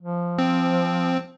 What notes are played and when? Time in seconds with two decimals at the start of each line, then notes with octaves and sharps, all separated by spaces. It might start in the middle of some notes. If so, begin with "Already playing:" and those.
0.02 F3
0.38 C4